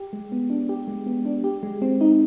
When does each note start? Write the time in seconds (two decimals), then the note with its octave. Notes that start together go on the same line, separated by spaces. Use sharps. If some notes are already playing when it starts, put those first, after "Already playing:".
Already playing: G4
0.13 G#3
0.32 B3
0.50 D4
0.69 G4
0.88 G#3
1.06 B3
1.25 D4
1.44 G4
1.63 G#3
1.82 C4
2.01 D#4